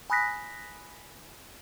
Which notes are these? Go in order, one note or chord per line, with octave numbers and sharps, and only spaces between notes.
G#5 B5 D#6 F#6 A#6 B6